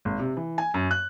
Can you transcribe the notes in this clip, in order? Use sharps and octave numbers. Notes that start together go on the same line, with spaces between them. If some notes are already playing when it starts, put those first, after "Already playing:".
G#1
C3
E3
G#5
F#2
F#6